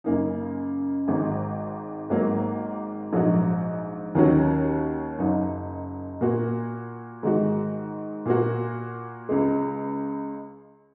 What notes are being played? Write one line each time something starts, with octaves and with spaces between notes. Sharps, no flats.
F#2 C#3 A#3 D#4
G#1 G#2 D#3
G#1 G#2 F#3 A#3
A#1 G#2 F#3 D#4 F#4
D#2 D#3 F#3 C#4 F#4
F#1 F#2 F#3 D#4
A#2 A#3 F#4
G#2 D#3 G#3 F#4
A#2 A#3 F#4
C#2 C#3 G#3